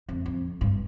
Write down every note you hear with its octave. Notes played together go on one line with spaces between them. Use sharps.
F2
F2
G2